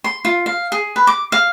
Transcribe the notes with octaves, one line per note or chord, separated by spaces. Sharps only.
C6
F4
F5
G#4
B4
D6
F5